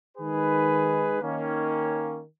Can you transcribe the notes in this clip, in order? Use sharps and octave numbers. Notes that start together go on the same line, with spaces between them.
D#3 G#3 D#4 G#4 B4
D#3 A#3 C#4